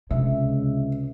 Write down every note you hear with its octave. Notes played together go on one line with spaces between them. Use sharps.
C#2 C3 E5